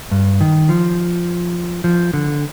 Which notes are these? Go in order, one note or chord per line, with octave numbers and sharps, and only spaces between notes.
G2
D#3
F3
F3
D3